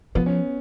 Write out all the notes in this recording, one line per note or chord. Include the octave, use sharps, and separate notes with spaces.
F3 B3
C#4